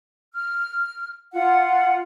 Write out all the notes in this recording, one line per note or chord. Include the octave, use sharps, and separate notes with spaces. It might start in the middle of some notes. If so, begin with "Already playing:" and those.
F6
F4 F#5